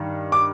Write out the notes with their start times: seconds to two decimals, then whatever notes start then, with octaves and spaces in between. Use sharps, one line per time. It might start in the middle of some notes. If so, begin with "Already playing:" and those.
Already playing: G2 D#3
0.32 D6